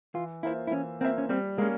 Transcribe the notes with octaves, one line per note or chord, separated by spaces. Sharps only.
E3 F4
A#3 E4 F4 C5 E5
E4
E3 C#4
A#3 C4 F4 C5 E5
C#4
G3 C4
G#3 A#3 C#4